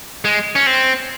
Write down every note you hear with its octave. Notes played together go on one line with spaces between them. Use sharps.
G#3
C#4
C4